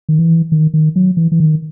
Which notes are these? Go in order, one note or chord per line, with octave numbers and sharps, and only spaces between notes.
D#3
E3
D#3
D#3
F#3
E3
E3
D#3